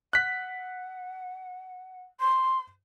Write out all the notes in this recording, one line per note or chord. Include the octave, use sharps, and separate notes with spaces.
F#5 F#6 B6
C6